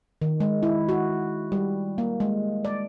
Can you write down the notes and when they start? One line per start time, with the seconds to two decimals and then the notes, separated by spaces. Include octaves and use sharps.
0.22 D#3
0.40 G#3
0.63 E4
0.89 F#4
1.52 G3
1.98 A#3
2.20 G#3
2.65 D5